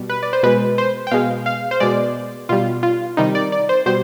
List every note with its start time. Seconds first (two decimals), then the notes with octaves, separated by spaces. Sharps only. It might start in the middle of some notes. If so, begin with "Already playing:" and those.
Already playing: B2 G3
0.10 B4
0.23 D5
0.33 C5
0.43 B2 G#3 B4
0.78 C5
1.07 G5
1.11 B2 G#3 F5
1.46 F5
1.71 C5
1.80 B2 G#3 D5
2.49 B2 G3 F4
2.83 F4
3.17 C3 D#3 G3 D#4
3.35 D5
3.52 D5
3.69 C5
3.86 B2 G3 C5